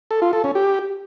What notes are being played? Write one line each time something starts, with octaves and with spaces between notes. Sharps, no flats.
A4
F4
A4
C#4
G4